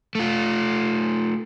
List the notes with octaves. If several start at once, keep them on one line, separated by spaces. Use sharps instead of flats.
A3 F4